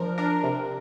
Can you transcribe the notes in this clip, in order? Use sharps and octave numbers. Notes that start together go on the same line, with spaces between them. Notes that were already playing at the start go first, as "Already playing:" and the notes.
Already playing: F3 D4 A#4
D4 A#4
C3